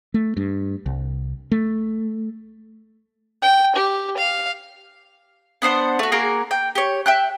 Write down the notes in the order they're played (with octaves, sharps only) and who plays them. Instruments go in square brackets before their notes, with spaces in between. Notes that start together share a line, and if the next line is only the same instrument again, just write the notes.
[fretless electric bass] A3
G2
C2
A3
[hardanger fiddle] G5
G4
F5
[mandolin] B3 D4 C5 F#5
A3 F#4
A#3 F#4 G#4 A#4
G5
G4 C#5
E5 G5 F#6